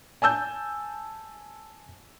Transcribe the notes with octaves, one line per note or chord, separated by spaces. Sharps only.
G#5 A5 E6 G6